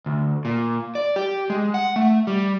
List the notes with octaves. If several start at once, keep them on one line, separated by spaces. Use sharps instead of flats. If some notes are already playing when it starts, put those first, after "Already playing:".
D2
A#2
D5
G4
G#3
F#5
A3
G3